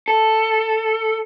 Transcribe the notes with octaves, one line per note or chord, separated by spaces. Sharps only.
A4